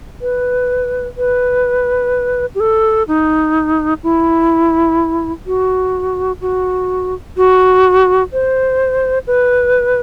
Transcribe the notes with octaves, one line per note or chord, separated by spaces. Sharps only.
B4
B4
G4
A4
D#4
E4
F#4
F#4
F#4
C5
B4